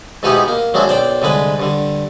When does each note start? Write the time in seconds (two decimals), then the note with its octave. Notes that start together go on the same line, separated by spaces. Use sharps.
0.23 G#2 B2 B3 D#4 E4 G4
0.48 A#3
0.74 F#3 G#3 C4 D4 E4
0.88 B1 C5 D5 G5
1.22 C2 D3 G#3 B4
1.60 G2 D3